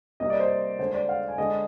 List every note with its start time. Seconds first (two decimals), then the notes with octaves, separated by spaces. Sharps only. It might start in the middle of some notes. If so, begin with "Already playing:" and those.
0.20 C3 G3 A#3 D#5
0.30 D5
0.40 C5
0.79 D3 G#3 C5
0.94 D5
1.09 F5
1.28 G#5
1.38 D3 G#3 D#5